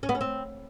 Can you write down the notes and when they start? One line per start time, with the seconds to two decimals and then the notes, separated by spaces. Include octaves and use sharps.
0.03 C#4
0.09 B3
0.15 C#4
0.21 C4